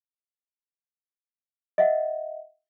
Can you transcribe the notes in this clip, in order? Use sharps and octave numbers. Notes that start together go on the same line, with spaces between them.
D#5 E5 F#5